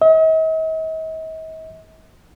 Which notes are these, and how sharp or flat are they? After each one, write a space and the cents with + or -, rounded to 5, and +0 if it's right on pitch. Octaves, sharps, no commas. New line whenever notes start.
D#5 +45